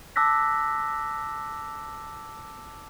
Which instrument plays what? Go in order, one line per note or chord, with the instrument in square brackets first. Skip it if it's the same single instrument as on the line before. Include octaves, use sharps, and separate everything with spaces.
[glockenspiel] A5 D6 E6 F#6 A#6 B6